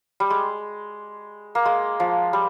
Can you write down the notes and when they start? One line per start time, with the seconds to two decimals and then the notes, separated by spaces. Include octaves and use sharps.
0.20 G3
0.30 G#3
1.55 A#3
1.65 G#3
2.00 F3
2.33 G3